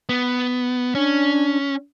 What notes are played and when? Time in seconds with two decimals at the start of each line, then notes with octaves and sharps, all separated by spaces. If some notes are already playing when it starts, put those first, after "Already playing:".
0.09 B3
0.95 C#4 D4